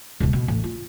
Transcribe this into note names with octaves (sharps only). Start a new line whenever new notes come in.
D#1 C2
B2
A1
F4